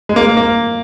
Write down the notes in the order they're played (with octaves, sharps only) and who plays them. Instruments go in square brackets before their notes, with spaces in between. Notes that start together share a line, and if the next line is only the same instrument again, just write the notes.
[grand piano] G#3
A#3
A#3